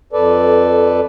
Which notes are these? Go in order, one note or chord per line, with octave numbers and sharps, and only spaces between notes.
F2 A4 B4 D5